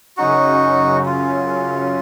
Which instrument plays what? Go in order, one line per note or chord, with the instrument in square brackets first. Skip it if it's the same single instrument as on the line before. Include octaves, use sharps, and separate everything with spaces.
[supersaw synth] F#2 C#3 F#3 C#4 [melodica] D#4 F#4
[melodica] F4